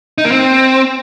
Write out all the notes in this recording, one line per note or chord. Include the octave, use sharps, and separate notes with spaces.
D#4
A#3
C4